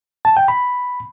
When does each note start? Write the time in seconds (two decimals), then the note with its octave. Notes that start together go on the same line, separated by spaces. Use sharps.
0.25 A5
0.37 G5
0.48 B5